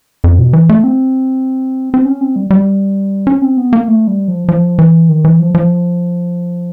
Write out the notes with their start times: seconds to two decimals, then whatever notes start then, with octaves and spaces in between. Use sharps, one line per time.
0.24 F2
0.39 B2
0.53 E3
0.69 A3
0.84 C4
1.94 C4
2.05 C#4
2.21 C4
2.36 G3
2.51 G3
3.27 C#4
3.42 C4
3.57 B3
3.73 A#3
3.88 A3
4.07 G3
4.28 F3
4.49 F3
4.79 E3
5.09 D#3
5.25 E3
5.40 F3
5.55 F3